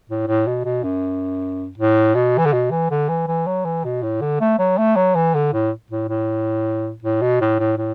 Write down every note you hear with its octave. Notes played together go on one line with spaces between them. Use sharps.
A2
A2
B2
B2
F#2
A2
B2
E3
D3
B2
E3
D3
E3
E3
F#3
E3
B2
A2
D3
A3
F#3
A3
F#3
E3
D3
A2
A2
A2
A2
B2
A2
A2
A2